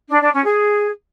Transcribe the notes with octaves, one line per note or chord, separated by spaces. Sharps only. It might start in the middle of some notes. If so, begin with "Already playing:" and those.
D4
D4
C#4
G#4